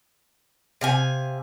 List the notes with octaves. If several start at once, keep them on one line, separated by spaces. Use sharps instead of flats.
C3 F5 G#5